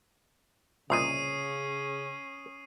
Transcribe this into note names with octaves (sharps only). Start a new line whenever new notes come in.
C2 A#2 C#3 C#4 D#5 D#6 C7 D#7